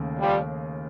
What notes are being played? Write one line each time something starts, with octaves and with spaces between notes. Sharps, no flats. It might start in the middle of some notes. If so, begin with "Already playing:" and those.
Already playing: D#2 C#3 A3
F3 G3